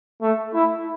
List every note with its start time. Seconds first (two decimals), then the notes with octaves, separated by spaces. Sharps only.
0.22 A3
0.54 E4